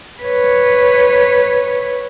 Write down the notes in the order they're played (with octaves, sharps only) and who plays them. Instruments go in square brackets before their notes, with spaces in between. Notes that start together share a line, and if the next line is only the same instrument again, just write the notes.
[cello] B4 C#5